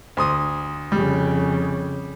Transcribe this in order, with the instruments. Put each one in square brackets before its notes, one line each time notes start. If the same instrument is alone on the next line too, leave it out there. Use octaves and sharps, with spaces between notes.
[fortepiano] D2 C6 D#6
[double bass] F2 C#3 [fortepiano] G3